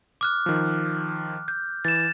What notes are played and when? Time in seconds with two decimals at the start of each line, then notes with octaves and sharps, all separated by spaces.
0.21 D6 F6 F#6
0.46 D#3 F3
1.48 G6
1.85 E3 A6 E7